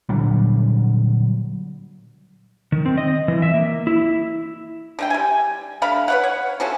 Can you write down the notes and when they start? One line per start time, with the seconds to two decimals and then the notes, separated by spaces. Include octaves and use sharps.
0.09 A#2 D3 F#3 G3
2.72 D#3
2.86 C4
2.98 D#5
3.28 E3
3.42 E5
3.54 A#3
3.87 E4
4.99 D3 A3 G5
5.10 G3 G#5
5.82 D3 A3 F5 B5
6.08 B4 C#5 F#5
6.23 C#5
6.60 F3 C#4 F#4 A4